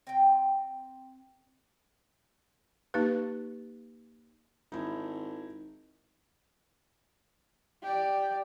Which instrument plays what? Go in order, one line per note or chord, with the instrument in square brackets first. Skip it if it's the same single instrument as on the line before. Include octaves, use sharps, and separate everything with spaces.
[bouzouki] C4 G5
[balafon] A#3 D#4 G4 B4
[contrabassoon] G#1 [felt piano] D#4 E4
[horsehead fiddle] G4 D5